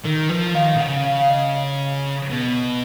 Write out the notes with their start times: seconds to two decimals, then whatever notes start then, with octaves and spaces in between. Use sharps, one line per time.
0.05 D#3 A#4
0.30 F3 B4
0.55 D#3 F5
0.75 B2
0.80 C#3 F#5
1.05 F5
1.20 F5
1.30 D#5
2.30 B2